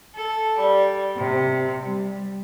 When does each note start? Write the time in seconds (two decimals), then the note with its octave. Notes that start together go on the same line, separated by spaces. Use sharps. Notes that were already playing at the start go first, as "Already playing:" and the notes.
0.15 A4
0.57 G3
1.16 C3
1.80 G3